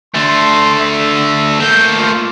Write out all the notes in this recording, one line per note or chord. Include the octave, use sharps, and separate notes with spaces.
D3 A3 C6
E5
A3 A#3 G6
F4